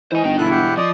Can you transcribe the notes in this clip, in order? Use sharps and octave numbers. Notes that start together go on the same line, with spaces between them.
E3 C5 D#5 G#5
G1 D#4 G5
E2 B2 E4 A4 F#6
G4 F#5
F3 D5 D#5